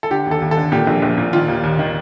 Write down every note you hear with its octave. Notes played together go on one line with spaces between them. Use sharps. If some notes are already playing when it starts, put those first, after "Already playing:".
A4
D3 G4
D#2
A4
D#2
A4
D3
A#2 G4
A#1
A#1
A#2
D#3 F4
D#2
D#2
D#3